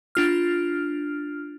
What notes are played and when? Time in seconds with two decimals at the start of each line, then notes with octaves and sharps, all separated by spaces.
0.15 D4 F4 F6